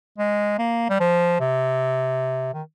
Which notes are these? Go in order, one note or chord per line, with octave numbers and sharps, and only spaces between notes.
G#3
A#3
G3
F3
C3
D#3